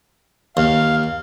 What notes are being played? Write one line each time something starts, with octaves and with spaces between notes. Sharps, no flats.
D#2 F5